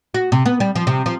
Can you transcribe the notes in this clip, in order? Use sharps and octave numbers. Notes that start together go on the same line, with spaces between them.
F#4
C3
B3
G3
F3
C3
F3